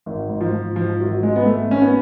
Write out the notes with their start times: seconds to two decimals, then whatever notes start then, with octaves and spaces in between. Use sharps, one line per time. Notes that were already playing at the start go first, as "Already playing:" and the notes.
0.06 G#1
0.29 G#2
0.41 F3
0.53 G#2
0.76 G#2 F3
1.00 G#1 F#3
1.23 G#2 G#3
1.36 B3
1.46 G#2 A3
1.70 G#1 C#4
1.82 B3